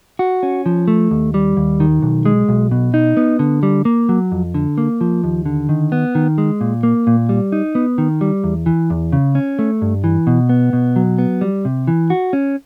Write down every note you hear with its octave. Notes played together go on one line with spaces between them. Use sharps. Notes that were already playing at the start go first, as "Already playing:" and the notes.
F#4
C#4
F3
A3
D#2
G3
D#2
D#3
B1
G#3
B1
B2
D#4
B3
D3
G3
A#3
F#3
F2
D3
A#3
F3
D#2
D3
D#3
B3
D#3
G#3
A#2
A#3
A#2
G3
D#4
B3
D#3
G3
E2
E3
E2
C#3
C#4
A3
G2
E3
B2
B3
B2
F#3
B3
G3
C3
E3
F#4
C#4